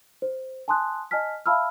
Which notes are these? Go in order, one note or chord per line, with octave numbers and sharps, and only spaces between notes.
C5
G#5 A5 C6 D#6 F#6
D#5 G#5 A5 F6 B6
E5 F5 A5 B5 E6 F6